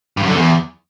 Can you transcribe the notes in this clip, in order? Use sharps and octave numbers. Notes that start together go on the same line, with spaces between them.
G2
F#2
D3
E2